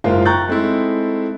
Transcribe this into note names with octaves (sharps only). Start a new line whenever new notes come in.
F#1 G#2 A#3 F4 C5
G5 A#5 C#6 F#6 G6 A6
G#3 A3 C4 D#4 E4